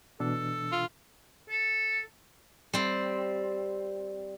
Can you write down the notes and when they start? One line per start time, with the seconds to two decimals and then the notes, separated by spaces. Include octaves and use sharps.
0.20 B2 E3 D4 A4
0.72 F4
1.50 A4
2.73 G3 C4